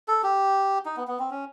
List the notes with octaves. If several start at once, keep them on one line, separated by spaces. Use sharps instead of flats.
A4
G4
D#4
B3
B3
C4
C#4